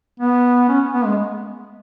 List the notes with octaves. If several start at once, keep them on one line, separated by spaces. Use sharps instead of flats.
B3
C#4
B3
G#3